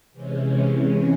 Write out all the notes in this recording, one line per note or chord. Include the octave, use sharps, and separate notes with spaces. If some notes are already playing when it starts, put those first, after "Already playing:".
C3 E3 G#3 C#4